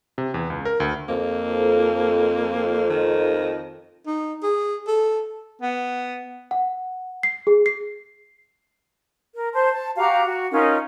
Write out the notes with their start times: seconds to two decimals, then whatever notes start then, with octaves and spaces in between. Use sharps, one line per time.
0.18 C3
0.34 E2
0.50 C#2
0.65 A#4
0.80 D2
1.08 F2 A#3
2.89 D#3
4.06 D#4
4.43 G#4
4.88 A4
5.62 B3
6.51 F#5
7.23 C7
7.47 G#4
7.66 C7
9.35 A#4
9.54 C5 A5 C6
9.73 A5
9.97 F#4 G4 F5 A#5
10.25 F#4
10.51 C#4 D#4 F4 A#4